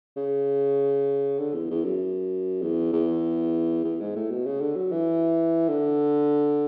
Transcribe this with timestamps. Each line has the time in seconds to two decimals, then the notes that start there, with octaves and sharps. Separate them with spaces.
0.16 C#3
1.39 D3
1.54 E2
1.70 E2
1.85 F#2
2.62 E2
2.93 E2
3.84 E2
4.00 G#2
4.15 A2
4.30 B2
4.46 C#3
4.60 D3
4.76 F#3
4.92 E3
5.69 D3